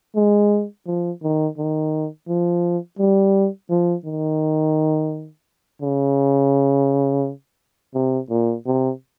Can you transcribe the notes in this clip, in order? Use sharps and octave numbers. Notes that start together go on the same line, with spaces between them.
G#3
F3
D#3
D#3
F3
G3
F3
D#3
C#3
C3
A#2
C3